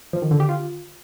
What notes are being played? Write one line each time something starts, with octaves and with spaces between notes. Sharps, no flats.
F3
D#3
D3
G4
F4